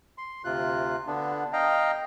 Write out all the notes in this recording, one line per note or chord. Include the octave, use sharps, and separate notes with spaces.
C6
D2 C3 F4 F#6
D3 B3 D4
D#5 F5 G5 A#5